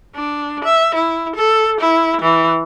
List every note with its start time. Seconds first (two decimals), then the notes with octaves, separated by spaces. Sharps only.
0.15 D4
0.64 E5
0.95 E4
1.36 A4
1.81 E4
2.22 E3